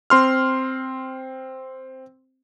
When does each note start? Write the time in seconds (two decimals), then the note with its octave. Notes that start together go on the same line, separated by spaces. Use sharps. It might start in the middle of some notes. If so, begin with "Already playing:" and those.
0.10 C4 C6 F6